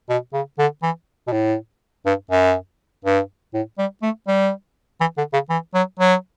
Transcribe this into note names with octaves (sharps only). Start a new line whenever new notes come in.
B2
C#3
D3
E3
B2
A2
G2
F#2
G2
A2
G3
A3
G3
E3
D3
C#3
E3
F#3
F#3